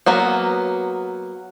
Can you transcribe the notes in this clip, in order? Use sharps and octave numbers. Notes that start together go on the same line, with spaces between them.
F#3 A#3 B3